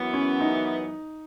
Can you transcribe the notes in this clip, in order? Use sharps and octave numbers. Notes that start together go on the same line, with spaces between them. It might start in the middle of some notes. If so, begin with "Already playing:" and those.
Already playing: F#2 E3 B3
C#4
D#4